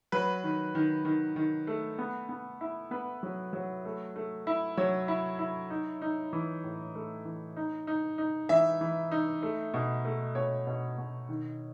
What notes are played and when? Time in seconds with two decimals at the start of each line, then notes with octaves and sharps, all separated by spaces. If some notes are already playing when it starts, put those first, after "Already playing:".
0.12 F#3 B4
0.44 D#3
0.75 D#3
1.05 D#3
1.36 D#3
1.67 A3
1.98 B3
2.29 B3
2.61 E4
2.91 B3 B4
3.23 F#3
3.53 F#3
3.85 A3
4.16 A3
4.47 E4
4.77 F#3 C#5
5.08 E4
5.39 E4
5.70 D#4
6.02 D#4
6.33 E3
6.64 A2
6.95 A3
7.25 E3
7.56 D#4
7.87 D#4
8.18 D#4
8.49 E3 E5
8.81 E3
9.12 D#4
9.42 A3
9.74 B2
10.05 A3
10.35 B2 C#5
10.67 B2
10.98 B2
11.29 D#3